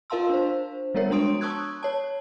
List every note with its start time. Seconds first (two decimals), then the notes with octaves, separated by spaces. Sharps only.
0.10 F4 A#4 F5 A5 C6 E6
0.29 D4 C5
0.95 F3 G3 B3 A#4 C#5
1.10 G#3 D4 A#5 C6 D#6 D7
1.41 A5 C#6 D#6 E6 F#6 G#6
1.83 C#5 A5